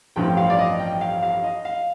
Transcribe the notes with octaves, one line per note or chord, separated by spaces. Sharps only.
A1 G2 F3 C4 F4 G5
F5
D5
D#5
G5
F5
F5
D#5
F5